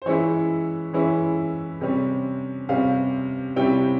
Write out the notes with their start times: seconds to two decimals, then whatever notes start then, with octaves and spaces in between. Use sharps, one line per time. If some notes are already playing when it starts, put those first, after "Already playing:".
0.02 C5
0.06 E3 G#3 C#4 E4 C#5
0.93 E3 G#3 C#4 E4
1.81 C3 G3 C#4
2.69 C3 G3 C#4 F5
3.56 C3 G3 C#4 E4 G5